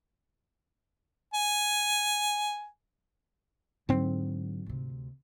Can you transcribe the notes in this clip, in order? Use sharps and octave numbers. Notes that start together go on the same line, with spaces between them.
G#5
G#2 D3 F#3 C4
D2 C3